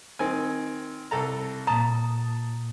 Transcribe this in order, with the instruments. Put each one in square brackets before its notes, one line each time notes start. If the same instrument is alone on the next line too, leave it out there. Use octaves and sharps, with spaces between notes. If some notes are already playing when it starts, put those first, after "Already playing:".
[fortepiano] D#3 C4 G#5
C2 A4 A#5
[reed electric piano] A#2 D#6 [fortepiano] A5 [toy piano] A#5